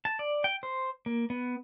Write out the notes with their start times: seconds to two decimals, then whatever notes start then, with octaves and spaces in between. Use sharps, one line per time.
0.05 A5
0.19 D5
0.44 G5
0.63 C5
1.06 A#3
1.30 B3